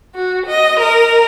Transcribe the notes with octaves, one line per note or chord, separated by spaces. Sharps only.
F#4
D#5
A#4